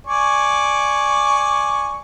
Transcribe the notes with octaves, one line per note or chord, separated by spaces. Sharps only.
D5 G#5 C#6